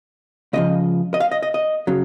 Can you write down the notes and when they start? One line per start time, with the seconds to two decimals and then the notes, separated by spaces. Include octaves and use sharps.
0.53 C#2 C#3 F3 D#5
1.14 D#5
1.20 F5
1.31 D#5
1.43 D#5
1.54 D#5
1.87 C#3 F#3